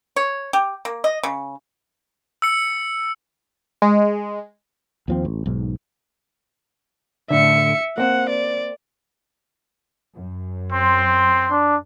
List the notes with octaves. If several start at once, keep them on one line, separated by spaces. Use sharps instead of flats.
C#5
G4
A#3
D#5
C#3
E6 C#7
G#3
D#2 F3 C4
A1
B1 G#2 B2
A2 D3 E5 C#7
A#3 C4 F#5
D5
F#2
C4 C6
D4